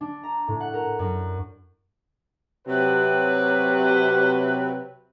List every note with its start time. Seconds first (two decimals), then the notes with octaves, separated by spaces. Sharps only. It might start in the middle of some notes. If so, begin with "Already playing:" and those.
0.01 D4
0.23 A#5
0.48 A2
0.60 F#5
0.74 A#4
0.99 F#2
2.68 C3 F#3 B4